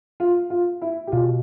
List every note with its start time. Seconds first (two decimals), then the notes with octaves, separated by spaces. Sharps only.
0.20 F4
0.50 F4
0.82 E4
1.07 G4
1.12 B2 F4